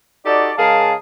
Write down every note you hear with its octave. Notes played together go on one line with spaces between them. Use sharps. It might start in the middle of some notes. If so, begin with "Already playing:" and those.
D#4 F#4 G4 A4 D5
C#3 G#3 G#4 A#4 F5 A5